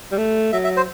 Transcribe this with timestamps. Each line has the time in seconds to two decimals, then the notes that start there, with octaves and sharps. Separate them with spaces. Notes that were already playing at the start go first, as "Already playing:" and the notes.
0.12 G3
0.18 A3
0.53 F#3 E5
0.64 E5
0.77 C5